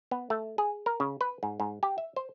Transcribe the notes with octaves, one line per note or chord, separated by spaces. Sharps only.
B3
A3
G#4
A#4
C#3
B4
G#2
G#2
G4
E5
C5